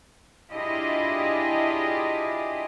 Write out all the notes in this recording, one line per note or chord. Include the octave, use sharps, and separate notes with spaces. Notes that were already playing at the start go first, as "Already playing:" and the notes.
D4 E4 F4 G4 G#4 D#5